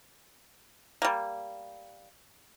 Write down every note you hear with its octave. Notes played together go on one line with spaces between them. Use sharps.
G3 A#3